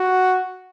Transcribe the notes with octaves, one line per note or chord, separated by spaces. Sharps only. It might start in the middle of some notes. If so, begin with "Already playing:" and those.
Already playing: F#4